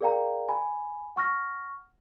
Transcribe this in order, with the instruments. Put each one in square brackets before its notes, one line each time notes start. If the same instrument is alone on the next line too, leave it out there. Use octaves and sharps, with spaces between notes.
[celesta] G#4 A#4 D5 F5 G5 A#5
G#5 B5
F#5 C#6 F6 A#6